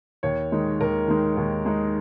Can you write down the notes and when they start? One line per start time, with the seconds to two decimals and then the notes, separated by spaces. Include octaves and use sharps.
0.23 D#2 C#5
0.52 D#3 G#3 D#4
0.80 D#2 A#4
1.08 D#3 G#3 D#4
1.37 D#2
1.65 D#3 G#3 D#4